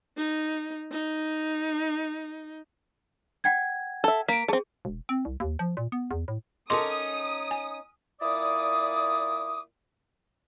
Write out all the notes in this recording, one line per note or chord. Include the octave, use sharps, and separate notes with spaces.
D#4
D#4
F#5 G5 G#6
A4 E5
A#3 B6 D7
A3 C4 G#4
E1
C4
C2
D#2
F3
A#2
B3
E2
A2
C#4 D#4 A4 A#4 C6 D6 D#6
G#5
A#2 E4 D5 D6 D#6